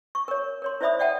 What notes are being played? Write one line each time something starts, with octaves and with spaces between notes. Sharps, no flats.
C#6
A#4 C#5
A#4 C#5 C6
E4 C5 D5 E5 B5 D#6
D5 E5 F#5 G5 A5